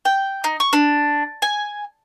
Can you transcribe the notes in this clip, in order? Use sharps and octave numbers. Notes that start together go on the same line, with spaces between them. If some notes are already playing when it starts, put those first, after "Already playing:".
G5
D#4
C#6
D4
G#5